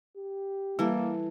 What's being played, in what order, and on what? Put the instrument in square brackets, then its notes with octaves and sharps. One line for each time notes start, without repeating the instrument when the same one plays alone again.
[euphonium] G4
[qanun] E3 A4 [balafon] G3 [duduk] A#3